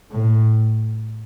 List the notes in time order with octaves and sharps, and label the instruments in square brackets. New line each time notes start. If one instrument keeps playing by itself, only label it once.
[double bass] A2